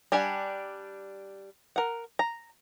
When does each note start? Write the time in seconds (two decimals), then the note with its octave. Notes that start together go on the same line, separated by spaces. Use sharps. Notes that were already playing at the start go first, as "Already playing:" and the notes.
0.12 G3 D4 G4 F#5 G#5
1.76 A#4 F#5
2.19 A#5